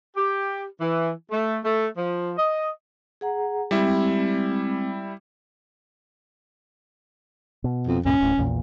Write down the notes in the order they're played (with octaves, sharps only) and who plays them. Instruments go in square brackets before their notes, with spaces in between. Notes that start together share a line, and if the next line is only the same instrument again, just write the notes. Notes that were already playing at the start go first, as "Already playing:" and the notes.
[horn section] G4
E3
A3
A3
F3
D#5
[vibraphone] G#4 F#5 A#5
[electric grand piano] G3 E4 [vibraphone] G#3 C4
[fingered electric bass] B2
[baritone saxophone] F2
[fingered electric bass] C#2 G2 A#2 [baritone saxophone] C#4
[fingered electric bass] D1 A2
A#1 E2 A#2